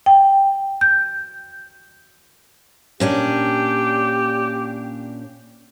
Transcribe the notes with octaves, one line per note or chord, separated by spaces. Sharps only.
G5
G6
A#2 C#4 D4 G4